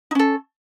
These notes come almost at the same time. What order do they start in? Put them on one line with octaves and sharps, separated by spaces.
D#4 C#4 A4